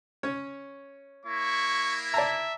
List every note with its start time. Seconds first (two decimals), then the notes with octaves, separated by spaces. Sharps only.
0.23 C#4 C#5
1.26 A#3 E4 C#6
2.14 D5 E5 A5 A#5